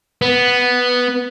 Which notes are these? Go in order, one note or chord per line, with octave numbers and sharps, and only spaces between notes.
B3